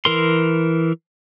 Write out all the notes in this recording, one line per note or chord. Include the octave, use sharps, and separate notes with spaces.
E3 A#4 C6